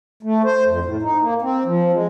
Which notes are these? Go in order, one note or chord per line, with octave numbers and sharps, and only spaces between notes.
A3
C5
F2
A2
D#4
A#3
C4
F3
G#3